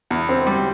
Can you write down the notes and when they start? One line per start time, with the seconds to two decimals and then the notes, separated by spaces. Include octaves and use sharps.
0.10 E2
0.29 C4
0.47 G3